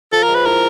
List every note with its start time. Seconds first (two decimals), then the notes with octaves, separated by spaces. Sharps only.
0.12 F3 A4
0.23 A#4
0.28 G#3
0.35 B4
0.45 E4 A#4